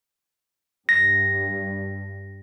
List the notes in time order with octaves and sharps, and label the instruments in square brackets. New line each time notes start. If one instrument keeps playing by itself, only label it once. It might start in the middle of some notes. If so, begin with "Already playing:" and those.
[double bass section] G2 [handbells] A#6